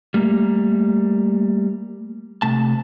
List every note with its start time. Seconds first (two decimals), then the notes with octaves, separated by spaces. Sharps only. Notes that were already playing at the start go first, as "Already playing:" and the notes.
0.14 G3 A3 A#3
2.42 C3 A3 A5